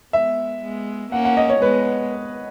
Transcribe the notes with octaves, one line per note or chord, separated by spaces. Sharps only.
G#3 B3 E5
G#3 B3
A#3 C#4 F#5
F#5
D#5
C#5
G#3 B3 B4